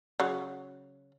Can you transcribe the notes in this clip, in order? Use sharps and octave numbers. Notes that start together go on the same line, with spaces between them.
C#3 F#3